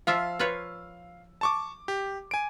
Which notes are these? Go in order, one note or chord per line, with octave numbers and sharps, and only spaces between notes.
F3 F4 E5 F5 E6
F4 B4 C#5
A5 C#6 D6
G4
G#5 D7